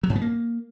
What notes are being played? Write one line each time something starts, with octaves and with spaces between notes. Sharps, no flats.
F#3
G#2
B3
A#3